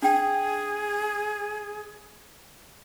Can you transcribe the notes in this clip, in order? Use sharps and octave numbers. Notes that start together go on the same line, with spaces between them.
D4 G#4 G5